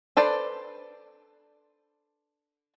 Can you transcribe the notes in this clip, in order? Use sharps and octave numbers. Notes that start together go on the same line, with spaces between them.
D4 A4 B4 C5 D5